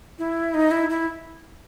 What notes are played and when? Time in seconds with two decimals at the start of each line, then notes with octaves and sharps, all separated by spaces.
0.19 E4
0.54 D#4
0.71 E4
0.90 E4